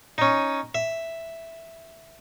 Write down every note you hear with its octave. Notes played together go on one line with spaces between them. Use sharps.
C#4 D#4
E5